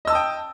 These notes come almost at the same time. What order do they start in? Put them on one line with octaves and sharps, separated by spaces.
D#5 E6 A5 D#6 G5